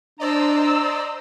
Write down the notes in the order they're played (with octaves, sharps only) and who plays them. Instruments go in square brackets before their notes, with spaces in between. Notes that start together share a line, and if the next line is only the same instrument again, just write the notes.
[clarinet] D4 [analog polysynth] C5 D5 D#5 [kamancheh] A#5 E6